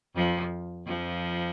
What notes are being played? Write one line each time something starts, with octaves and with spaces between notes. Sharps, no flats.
F2 F3
F2 F3